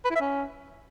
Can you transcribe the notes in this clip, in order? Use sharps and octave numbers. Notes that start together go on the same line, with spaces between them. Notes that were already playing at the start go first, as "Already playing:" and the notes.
B4
E4
E5
C#4